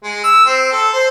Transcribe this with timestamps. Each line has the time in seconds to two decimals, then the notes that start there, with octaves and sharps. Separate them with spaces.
0.03 G#3
0.24 E6
0.46 C4
0.72 A4
0.93 C5